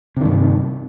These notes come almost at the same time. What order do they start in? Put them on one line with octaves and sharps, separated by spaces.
C3 D#3 G2